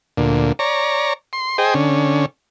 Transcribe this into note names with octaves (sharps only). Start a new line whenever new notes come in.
D2 A#2
C#5 D5 A#5
C6
G#4 C5 D#5 G5
D3 C#4